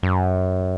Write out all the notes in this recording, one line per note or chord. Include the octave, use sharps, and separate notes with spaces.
F#2